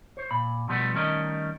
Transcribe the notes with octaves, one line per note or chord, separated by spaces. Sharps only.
C5 C#5
A#2 B5
B2 F3 G3 A3 B3
D#3 G3 A3 C#4 A#4 D#5